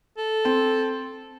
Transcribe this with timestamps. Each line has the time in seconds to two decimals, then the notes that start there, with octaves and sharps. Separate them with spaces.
0.18 A4
0.45 C4